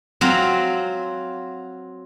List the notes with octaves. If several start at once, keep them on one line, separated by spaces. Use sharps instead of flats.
F#3 C4 F4